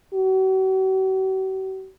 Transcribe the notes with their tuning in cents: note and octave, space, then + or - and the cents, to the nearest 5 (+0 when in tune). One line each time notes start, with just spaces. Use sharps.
F#4 +45